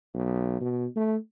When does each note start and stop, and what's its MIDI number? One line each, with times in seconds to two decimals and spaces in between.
0.14 0.57 35
0.61 0.86 47
0.96 1.16 57